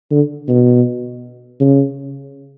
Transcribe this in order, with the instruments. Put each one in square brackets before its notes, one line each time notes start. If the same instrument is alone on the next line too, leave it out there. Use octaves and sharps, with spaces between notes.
[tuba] D3
B2
C#3